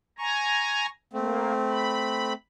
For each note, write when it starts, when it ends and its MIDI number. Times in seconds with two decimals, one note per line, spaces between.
0.19 0.86 80
0.19 0.86 82
0.19 0.89 85
1.13 2.33 57
1.13 1.53 58
1.13 2.33 60
1.70 2.33 83